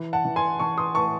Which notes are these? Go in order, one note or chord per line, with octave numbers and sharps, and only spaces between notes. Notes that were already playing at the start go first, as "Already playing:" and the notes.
Already playing: E3
F#5 A5
E3
G#5 C6
E3 A5 C#6
C6 D#6
A2 A5 C#6